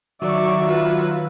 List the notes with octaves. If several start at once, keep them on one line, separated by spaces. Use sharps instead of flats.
D#3 F#3 F#4 D5 E5 C#6
F4 B4